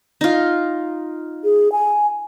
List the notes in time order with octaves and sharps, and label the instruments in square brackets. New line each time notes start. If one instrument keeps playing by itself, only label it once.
[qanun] D#4 F4
[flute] G#4
G#5